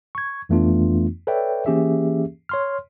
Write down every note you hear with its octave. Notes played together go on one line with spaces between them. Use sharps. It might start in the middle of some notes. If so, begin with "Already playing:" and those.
C#6 G#6
F2 E3 A3 B3 D4 F4
A4 B4 C#5 D5 E5 G5
E3 A#3 C#4 G4 G#4 E5
C#5 C6 F6